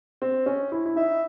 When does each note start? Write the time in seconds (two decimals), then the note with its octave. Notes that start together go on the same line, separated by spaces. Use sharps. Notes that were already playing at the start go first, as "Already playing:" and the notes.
0.22 C4
0.46 C#4
0.72 E4
0.86 E4
0.96 D#4 E5